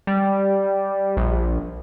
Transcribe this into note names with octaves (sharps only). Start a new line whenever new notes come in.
G3
A#1